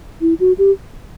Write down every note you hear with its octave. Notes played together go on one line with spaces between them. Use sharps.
E4
F#4
G4